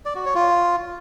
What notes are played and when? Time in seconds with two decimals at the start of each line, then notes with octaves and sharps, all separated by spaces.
0.05 D5
0.15 F#4
0.25 C#5
0.35 F4